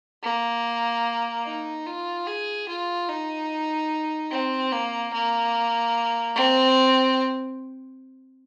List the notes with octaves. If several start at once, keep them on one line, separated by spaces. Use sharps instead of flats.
A#3
D#4
F4
G#4
F4
D#4
C4
A#3
A#3
C4